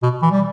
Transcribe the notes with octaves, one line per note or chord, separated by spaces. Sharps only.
B2
E3
G3